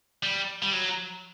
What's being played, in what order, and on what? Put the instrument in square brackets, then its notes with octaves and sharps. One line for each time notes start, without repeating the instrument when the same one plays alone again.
[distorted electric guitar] G3
G3
F#3